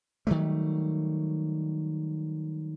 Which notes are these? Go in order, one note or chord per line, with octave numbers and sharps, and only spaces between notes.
D#3 F#3 G3 A3